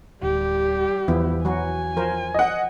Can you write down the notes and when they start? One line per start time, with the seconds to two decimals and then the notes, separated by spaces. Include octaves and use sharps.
0.23 D1 G3 G4
1.08 E2 F3 B3 E4
1.45 E3 F#3 F#4 G#5
1.97 F3 A#4 C5
2.34 D#5 F#5